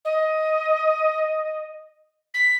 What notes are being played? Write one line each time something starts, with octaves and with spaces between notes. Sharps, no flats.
D#5
B6